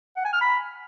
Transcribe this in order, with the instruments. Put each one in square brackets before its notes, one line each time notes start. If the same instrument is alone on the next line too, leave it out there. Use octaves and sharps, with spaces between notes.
[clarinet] F#5
G#5
F6
B5